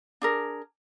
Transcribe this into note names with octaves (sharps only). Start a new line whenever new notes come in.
D4 G#4 A#4